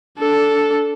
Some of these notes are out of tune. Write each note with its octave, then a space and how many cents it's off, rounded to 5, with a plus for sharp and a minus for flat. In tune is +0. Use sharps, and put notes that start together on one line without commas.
D4 -15 A4 +0